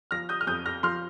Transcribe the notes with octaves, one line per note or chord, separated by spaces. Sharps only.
F3 F6 A#6
D#6 G6
F6
F2 D#6 G6
F6 A#6
F3 C6 F6